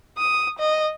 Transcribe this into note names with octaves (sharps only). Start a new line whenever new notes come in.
D#6
D#5